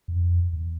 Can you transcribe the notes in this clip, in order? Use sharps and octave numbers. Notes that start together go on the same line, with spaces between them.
F2
E2